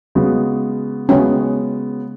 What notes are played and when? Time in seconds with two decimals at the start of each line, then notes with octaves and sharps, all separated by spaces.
0.15 C#3 G#3 B3 F#4
1.09 C#3 G#3 B3 C#4 F#4